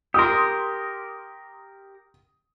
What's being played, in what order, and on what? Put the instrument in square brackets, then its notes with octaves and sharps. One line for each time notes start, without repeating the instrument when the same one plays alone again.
[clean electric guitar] G4 A#4 [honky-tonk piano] C6 D#6